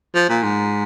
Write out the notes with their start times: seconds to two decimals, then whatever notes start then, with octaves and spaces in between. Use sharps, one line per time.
0.14 F3
0.29 A#2
0.43 G#2